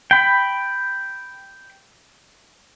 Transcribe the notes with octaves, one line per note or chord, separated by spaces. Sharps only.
G5 B5